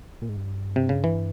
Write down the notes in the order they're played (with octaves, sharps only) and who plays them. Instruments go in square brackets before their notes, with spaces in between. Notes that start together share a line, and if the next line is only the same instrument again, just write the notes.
[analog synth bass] A#2
G#2
G2
[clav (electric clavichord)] C3
C#3
E3